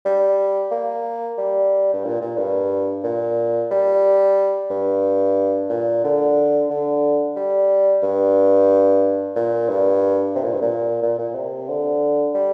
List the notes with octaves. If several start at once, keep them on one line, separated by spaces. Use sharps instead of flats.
G3
A#3
G3
G2
A#2
A#2
G2
A#2
G3
G2
A#2
D3
D3
G3
G2
A#2
G2
C3
A#2
G2
A#2
A#2
A#2
C3
D3
G3